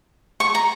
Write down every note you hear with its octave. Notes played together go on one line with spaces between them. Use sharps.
C#6
A#5